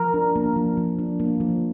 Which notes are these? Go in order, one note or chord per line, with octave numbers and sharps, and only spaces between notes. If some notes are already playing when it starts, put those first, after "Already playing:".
Already playing: F3 A#4
D4
A#3
F3
F3
D4
A#3
F3